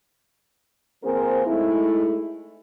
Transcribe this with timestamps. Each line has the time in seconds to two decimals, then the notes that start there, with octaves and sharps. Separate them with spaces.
1.03 F3 A#3 C4 G#4 A#4 C5
1.46 G#3 A3 D#4 E4